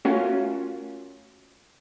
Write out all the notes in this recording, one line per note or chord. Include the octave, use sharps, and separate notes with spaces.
A3 C#4 F4 F#4 A#4